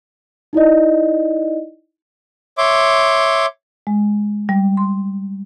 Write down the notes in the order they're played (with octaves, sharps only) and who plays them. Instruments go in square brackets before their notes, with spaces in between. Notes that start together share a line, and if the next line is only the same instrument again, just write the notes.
[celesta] D#4 E4 D5 D#5
[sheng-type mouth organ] C#5 E5 C6 D6
[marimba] G#3
G3
C6